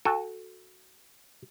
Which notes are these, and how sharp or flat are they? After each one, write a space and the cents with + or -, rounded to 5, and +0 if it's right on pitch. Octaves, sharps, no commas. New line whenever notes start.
F#4 -5 A4 +0 G#5 -45